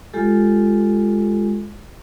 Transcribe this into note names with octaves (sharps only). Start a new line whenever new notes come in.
G#3 F4 G4 A4